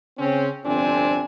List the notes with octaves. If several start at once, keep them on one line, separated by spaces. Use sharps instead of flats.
C#3 C4 C#4
G1 F2 C3 C4 D4 G#5